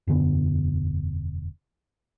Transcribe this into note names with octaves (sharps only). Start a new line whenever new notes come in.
E1 F#2 D3 B3